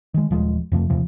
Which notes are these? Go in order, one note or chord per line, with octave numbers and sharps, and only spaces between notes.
D#3 G#3
D#1 F3 G#3
F2 C3 F3 A3
E2 C3 F3